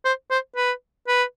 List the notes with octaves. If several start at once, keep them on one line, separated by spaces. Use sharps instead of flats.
C5
C5
B4
B4